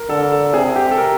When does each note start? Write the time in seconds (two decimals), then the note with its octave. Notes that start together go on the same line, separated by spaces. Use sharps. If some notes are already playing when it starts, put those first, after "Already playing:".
Already playing: A#4
0.09 D3 A4
0.32 A4
0.54 C3 G#4
0.76 G4
0.91 A4
0.98 A#4